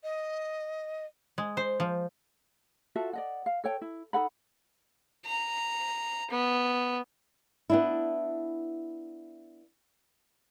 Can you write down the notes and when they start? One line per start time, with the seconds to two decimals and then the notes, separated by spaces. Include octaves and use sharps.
0.03 D#5
1.38 G#3
1.57 C5
1.80 F3
2.96 F4 F#4 A4 E5
3.13 D5 D#5 F#5
3.46 F5
3.64 A4 C#5 G5
3.81 E4
4.13 D#4 A4 F#5 B5
5.26 A#5
6.31 B3
7.70 B3 D4 E4